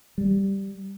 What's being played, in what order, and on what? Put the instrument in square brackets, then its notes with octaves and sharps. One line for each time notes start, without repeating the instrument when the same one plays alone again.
[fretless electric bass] G3